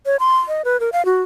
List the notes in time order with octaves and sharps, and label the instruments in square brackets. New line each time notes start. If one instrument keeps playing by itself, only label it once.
[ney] C#5
C6
D#5
B4
A#4
F5
F#4